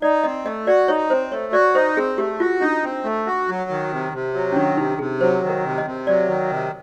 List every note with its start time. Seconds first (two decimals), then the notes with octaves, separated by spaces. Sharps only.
0.02 D#4 D5
0.24 C4 D#5
0.45 A3 D#5
0.67 F#4 D5
0.88 D#4 C#5
1.10 C4 C5
1.31 A3 C#5
1.53 F#4 D5
1.75 D#4 C5
1.97 C4 G#4
2.18 A3 G4
2.40 F4 F#4
2.61 D4 D#4
2.84 C4
3.04 A3
3.26 F#4
3.49 F#3
3.70 D#3
3.92 C3
4.13 C3
4.34 F#3
4.52 C#4
4.56 D#3 D4
4.77 C3 D#4
4.99 C3 G#4
5.21 F#3 C5
5.43 D#3
5.50 A#4
5.64 C3
5.78 D#5
5.85 C3
6.07 F#3 D5
6.28 D#3
6.50 C3